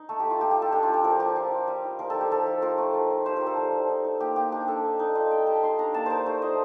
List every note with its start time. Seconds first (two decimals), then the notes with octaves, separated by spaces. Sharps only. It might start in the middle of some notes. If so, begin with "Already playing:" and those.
Already playing: D#4
0.09 A3 A4
0.20 A3 G4
0.30 F4
0.41 A3 G4
0.51 G4
0.57 F4
0.62 A4
0.72 D4 G4
0.83 F4
0.88 A3
0.94 G4
1.04 F3 A#4
1.20 F3 G4
1.36 F4
1.51 F4
1.68 G3
1.84 D#4
1.99 F3 A#4
2.10 D#4 A4
2.21 G4
2.30 F3 A4
2.46 F3
2.62 F4 A#4
2.78 A3
2.94 F3
3.10 F4
3.26 G3 C5
3.36 G3 A#4
3.46 A4
3.57 F3
3.73 F3
3.89 D#4
4.05 D#4
4.20 A#3 G4
4.36 A#3 G4
4.52 D4 G4
4.68 D4 A4
4.84 D#4
4.99 D#4
5.15 F4 D#5
5.31 F4 G5
5.47 G3 A5
5.63 D#4 C6
5.78 D4 A#5
5.94 A#3 A5
6.06 D#4 A#4 C5
6.26 A3 C5
6.42 F3 D#5